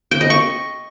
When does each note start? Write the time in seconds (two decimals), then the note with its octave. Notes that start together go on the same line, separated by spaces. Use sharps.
0.11 G5
0.21 D#5
0.30 C#6